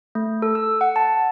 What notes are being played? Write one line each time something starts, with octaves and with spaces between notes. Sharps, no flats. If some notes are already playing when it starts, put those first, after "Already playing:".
A3
A4
E6
F#5
A5